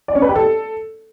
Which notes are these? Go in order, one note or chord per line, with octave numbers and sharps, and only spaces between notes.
D5
C#4
B4
G4
A4